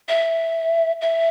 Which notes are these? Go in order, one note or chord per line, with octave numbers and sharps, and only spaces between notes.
E5
E5